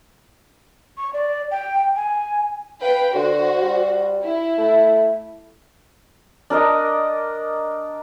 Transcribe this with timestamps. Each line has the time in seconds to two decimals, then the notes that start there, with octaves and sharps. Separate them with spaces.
0.97 C#6
1.13 D5
1.51 G5
1.96 G#5
2.81 B4 F5 G5
3.15 D3 F#4 C5
3.62 G3
4.23 E4
4.58 A3
6.50 D4 A#4 D5 D#5